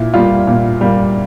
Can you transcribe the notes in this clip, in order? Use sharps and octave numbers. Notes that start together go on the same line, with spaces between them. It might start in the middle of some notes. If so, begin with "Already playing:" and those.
Already playing: A#2 E4
G3 A#3 F4
A#2
G3 A#3